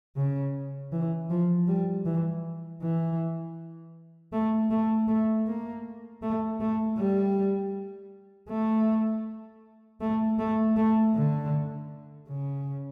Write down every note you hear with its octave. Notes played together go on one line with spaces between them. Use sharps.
C#3
E3
F3
G3
E3
E3
A3
A3
A3
A#3
A3
A3
G3
A3
A3
A3
A3
D3
C#3